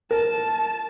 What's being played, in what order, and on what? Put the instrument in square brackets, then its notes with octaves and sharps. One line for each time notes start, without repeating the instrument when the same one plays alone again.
[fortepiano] A#4 [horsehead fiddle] A5